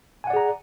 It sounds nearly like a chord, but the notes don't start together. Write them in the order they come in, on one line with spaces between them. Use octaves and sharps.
G#5 F#5 D5 G#4 A#5